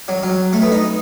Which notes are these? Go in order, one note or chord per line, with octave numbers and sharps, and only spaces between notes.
F#3
F#3
A3
B3
D#4